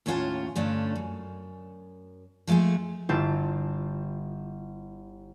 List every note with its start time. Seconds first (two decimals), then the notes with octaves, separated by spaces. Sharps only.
0.06 D#2 A2 C#4 F4 F#5 A5
0.56 G2 D3 A3 C#4 D4 F4
0.95 F#2
2.47 F3 G#3 A3 F4 G#4
3.09 G1 E4 F4 A5 G6